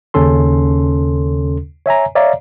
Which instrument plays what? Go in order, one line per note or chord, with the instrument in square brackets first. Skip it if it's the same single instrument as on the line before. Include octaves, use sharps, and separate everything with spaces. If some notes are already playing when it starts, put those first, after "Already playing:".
[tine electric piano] D#2 C#3 C#4 A4 C6
C#5 E5 G#5 A#5
C#5 D5 E5 F5 A#5